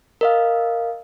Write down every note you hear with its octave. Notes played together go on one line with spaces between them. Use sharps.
A#4 D#5 F5